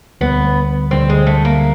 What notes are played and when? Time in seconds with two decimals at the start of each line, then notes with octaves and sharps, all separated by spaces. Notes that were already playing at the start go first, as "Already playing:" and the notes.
0.21 D2 D3 G3 B3
0.91 D2 D3 G3 C4
1.10 G#3
1.27 A3
1.45 A#3